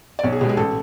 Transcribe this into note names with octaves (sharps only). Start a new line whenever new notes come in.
D5
B1 C#5
G#4
B2 G#3 G4
G#4
A1 A4